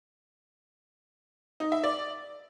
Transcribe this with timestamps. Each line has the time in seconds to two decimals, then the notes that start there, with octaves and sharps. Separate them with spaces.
1.60 D#4
1.72 E5
1.84 D5